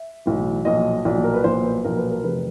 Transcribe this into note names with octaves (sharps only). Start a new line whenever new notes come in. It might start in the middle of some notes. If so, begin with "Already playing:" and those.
Already playing: E5
B1 A2 E3
B1 A#2 F3 D#5
B1 A#2 F3 D5
A#4
B4
B1 A#2 F3 C5
B4
B1 A#2 F3 A#4
B4
A#4
F1 E2 C3 B4